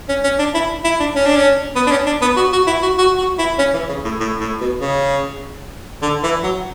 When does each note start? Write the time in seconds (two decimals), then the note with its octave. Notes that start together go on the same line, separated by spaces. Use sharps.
0.09 C#4
0.24 C#4
0.39 D4
0.54 E4
0.84 E4
1.00 D4
1.16 C#4
1.26 D4
1.36 C#4
1.76 B3
1.87 D4
1.91 C#4
2.06 D4
2.22 B3
2.37 F#4
2.52 F#4
2.67 E4
2.82 F#4
2.98 F#4
3.18 F#4
3.39 E4
3.59 C#4
3.73 E3
3.89 C#3
4.04 A2
4.20 A2
4.40 A2
4.61 B2
4.81 C#3
6.02 D3
6.23 E3
6.43 F#3